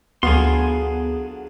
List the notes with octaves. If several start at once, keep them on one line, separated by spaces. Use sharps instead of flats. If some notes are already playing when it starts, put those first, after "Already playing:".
D2 D3 F#3 B3 F4 G#4 C6